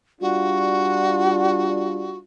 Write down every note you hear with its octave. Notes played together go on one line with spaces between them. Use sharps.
G3 D4 F4 F#4